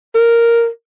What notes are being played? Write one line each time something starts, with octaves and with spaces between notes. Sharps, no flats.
A#4